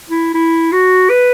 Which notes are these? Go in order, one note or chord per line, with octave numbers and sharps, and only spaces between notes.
E4
E4
F#4
B4